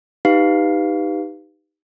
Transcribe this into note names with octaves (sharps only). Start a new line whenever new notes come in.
D#4 G4 B4 F5 C7